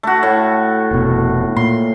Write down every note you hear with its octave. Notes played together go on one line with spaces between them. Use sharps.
A3 F#4
A2
F1 B2
A#2 C6